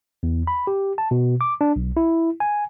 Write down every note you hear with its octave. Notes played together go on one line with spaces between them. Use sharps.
E2
B5
G4
A5
B2
D6
D4
B1
E4
G#5